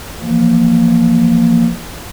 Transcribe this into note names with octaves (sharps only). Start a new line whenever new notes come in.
E3 F3 A#3